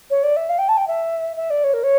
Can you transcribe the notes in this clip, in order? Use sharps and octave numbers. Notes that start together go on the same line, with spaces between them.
C#5
D5
E5
F5
G5
A5
G5
E5
E5
D5
C#5
A#4
C#5